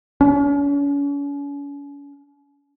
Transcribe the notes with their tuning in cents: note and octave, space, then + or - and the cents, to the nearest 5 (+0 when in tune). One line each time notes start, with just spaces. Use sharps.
C#4 +40